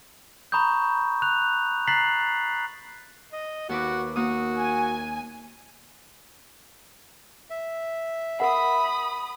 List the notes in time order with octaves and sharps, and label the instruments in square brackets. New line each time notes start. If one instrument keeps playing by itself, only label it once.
[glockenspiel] A#5 B5 C#6 D#6 G6
F#6 F7
A#5 F#6 A6 B6 C7 F#7
[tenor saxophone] D#5
[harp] D#2 B4 D6 [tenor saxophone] F#4
[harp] A#3 D#6 [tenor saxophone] F#4
[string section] G#5
[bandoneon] E5
[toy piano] A#4 F#5 [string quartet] B5 D#6